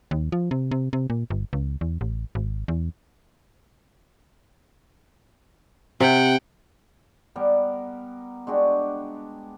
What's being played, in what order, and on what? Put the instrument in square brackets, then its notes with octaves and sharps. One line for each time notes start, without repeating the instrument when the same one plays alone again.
[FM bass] D#2
F3
C3
C3
C3
A#2
G1
C#2
E2
A1
G#1
E2
[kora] C3 [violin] F#5 G5
[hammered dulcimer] G3 B3 A#4
G#3 D4 F#4 G4